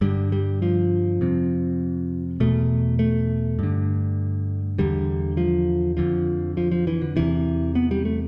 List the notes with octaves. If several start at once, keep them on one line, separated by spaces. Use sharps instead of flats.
G2 D3 G3
G3
F3
F2 C3
E2 B2 A3
A3
G2 D3
E2 D3 G3
F3
F2 D3 F3
F3
F3
E3
D3
E2 C3 E3
B3
G3
A3